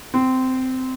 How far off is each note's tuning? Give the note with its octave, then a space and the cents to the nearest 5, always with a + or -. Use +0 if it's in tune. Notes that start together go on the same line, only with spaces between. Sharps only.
C4 -15